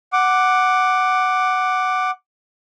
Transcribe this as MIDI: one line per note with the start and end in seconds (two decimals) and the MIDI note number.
0.13 2.11 78
0.13 2.11 86